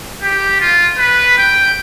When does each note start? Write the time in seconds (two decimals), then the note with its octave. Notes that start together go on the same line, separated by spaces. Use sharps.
0.23 G4
0.61 F4
0.98 B4
1.38 G5